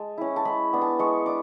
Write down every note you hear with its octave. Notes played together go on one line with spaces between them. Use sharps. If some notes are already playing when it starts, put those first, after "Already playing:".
Already playing: G#3 A5
C#4 E4
A5
G#3 B5
B3 D4
A5
G#3 C#6
D4 D6